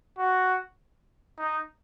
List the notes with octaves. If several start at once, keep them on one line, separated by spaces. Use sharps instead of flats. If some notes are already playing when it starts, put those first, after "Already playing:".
F#4
D#4